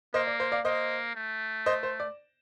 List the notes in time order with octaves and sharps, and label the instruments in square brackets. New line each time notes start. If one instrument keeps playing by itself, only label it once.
[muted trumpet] A#3 [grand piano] C5 D#5
[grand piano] D5
C5
D5 F5
[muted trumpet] A#3 [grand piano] C5 D#5
[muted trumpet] A3
[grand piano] C5 D#5
C5
D5